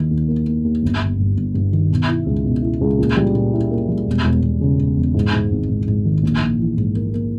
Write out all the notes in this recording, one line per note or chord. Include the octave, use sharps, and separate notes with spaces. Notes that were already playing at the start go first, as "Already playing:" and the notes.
Already playing: D#2 D#3
D#2
A#3
A#3
D#2
G1
G1
G2
G1
G2
D#3
B2
E4
C#2
B2
E4
C#2
A#2
G3
A#2
E4
A#3
G3
E1
E1
E1
C#3
E1
E2
G#2
G#2
G#1
G#2
G#2
D#3
A#1
A#1
E3
G#2
A#3
A#3